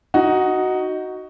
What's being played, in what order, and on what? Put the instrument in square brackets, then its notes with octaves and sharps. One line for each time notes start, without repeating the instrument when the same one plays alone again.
[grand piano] D#4 F#4